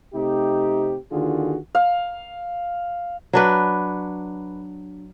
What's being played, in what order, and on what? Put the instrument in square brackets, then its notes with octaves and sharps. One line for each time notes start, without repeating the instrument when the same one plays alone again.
[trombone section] C3 A3 C4 D#4 G4
D#2 D3 D#3 F4 F#4 G#4
[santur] F5
[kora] F#3 D4 B4